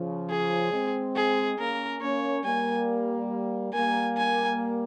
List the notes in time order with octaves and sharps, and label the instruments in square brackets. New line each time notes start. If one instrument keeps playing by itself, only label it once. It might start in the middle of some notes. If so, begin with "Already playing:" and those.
Already playing: [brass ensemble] C#3 F3
[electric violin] G#4
[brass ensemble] G#3 C4
[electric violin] G#4
[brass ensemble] A#3 C#4 [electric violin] A#4
[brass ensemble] A#3 C#4 [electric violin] C#5
[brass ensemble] G3 A#3 [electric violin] G#5
[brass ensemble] G3 A#3 [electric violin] G#5
[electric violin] G#5